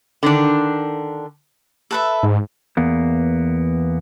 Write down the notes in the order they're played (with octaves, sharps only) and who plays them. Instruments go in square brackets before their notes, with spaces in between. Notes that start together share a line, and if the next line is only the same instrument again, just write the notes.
[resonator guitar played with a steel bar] D3 D#3 D4
[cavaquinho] A4 B4 E5
[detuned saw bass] G#2
[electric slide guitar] E2 A#3 B3